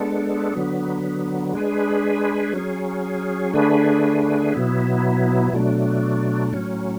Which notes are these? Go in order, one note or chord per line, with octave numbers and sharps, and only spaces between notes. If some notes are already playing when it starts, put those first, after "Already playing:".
Already playing: G#3 B3 D4 A4
D3 F#3 B3
G#3 D4 G#4 B4
F#3 C#4 G#4
D3 A3 D4 G#4 B4
B2 F#3 B3 E4
B2 F#3 A3 D4
A2 F#3 C#4